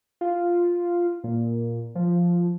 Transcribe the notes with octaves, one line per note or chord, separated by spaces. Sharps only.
F4
A#2
F3